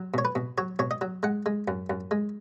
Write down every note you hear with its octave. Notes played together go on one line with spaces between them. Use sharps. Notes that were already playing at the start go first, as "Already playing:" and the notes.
Already playing: F#3
B2 C#5
B4
B2
F#3 C#5
B2 C#5
D#5
F#3
G#3 F#5
G#3
F#2
F#2
G#3